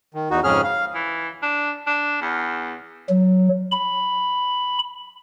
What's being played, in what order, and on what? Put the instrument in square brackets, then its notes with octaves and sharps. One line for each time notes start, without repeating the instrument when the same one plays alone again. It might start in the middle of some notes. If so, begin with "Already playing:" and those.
[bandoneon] D#3
E2 D#4 F#4
F2 G#2 C#3 C#4 G#4 F6
F5
[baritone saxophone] E3
D4
D4
E2
[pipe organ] F#3
B5